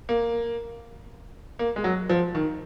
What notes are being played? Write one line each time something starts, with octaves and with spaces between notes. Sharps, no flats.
A#3
A#3
G#3
F#3
F3
D#3